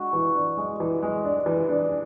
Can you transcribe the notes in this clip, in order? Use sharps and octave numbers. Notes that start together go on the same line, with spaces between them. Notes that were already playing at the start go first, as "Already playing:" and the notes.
Already playing: G#3 D4 F#4
E3
D4
G#3
E3
G#3
D4
E3
D4